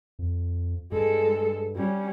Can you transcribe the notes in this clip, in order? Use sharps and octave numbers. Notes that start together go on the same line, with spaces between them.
F2
G2 G#3 A4
G3 C#4